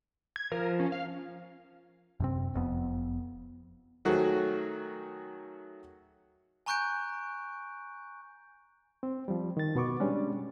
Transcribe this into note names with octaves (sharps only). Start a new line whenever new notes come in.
G#6
F3 A#4
C#4
F5
F#2 C3 C4
F1 F2 B3
D#3 F#3 A3 F#4 G#4
G#5 A#5 C#6 F#6 G6 D7
C4
F3 G3
D#3 A6
B2 B3 C#6 D6
G3 G#3 C#4 D4